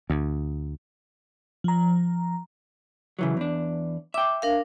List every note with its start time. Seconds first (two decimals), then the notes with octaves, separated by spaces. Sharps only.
0.10 D2
1.64 F3 A#5
3.19 C#3 E3 F#3
3.37 E2 D4
4.14 E5 G5 D6
4.42 D4 A#4 F5